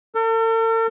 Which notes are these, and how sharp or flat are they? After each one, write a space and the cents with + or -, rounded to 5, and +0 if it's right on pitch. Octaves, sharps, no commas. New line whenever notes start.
A4 +45